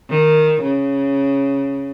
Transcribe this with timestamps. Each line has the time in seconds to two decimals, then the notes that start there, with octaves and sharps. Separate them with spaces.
0.10 D#3
0.62 C#3